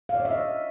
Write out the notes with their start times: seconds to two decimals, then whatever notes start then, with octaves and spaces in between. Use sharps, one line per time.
0.09 F5
0.15 D5
0.20 C#5
0.25 E5
0.31 D#5